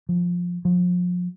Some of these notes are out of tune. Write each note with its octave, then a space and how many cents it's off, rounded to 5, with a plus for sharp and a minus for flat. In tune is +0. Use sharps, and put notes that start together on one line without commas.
F3 +10
F3 +35